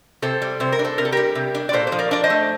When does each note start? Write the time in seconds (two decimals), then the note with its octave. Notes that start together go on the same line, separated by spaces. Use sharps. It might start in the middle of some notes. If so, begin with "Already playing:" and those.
0.22 C3 A4 C5
0.42 G3
0.60 C3 C5
0.72 A#4
0.79 D4
0.84 A4 C5
0.98 C3 A#4
1.05 A4
1.12 G3 G4 A#4
1.35 C3
1.55 D4
1.69 D5
1.73 A#2 A4 C5
1.87 C5
1.92 F3
1.99 A#4 D5
2.11 D4 D5
2.24 C5 D#5
2.30 A3